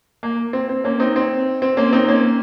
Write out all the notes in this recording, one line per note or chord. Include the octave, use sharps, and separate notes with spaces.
A#3
C4
C4
A#3 C#4
C4 D#4
C4
C4
A#3 C#4
C4 D#4
A#3 C#4